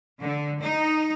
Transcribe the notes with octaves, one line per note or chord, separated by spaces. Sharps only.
D3
D#4